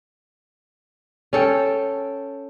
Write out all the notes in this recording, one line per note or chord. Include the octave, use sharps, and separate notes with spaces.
C#4 A4 G5